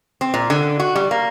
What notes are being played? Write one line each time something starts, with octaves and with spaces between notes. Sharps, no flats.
C4
A#2
D3
F#4
G3
A#3